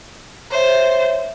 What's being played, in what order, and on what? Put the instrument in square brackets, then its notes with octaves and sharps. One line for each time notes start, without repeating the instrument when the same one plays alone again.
[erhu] C5 [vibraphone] C#5 E5